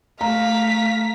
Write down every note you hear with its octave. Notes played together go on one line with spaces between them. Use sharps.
A3 F5 A#5 B6